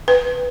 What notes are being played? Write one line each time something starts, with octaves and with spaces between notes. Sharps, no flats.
B4